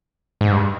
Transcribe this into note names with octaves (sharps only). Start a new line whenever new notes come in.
G#2
G2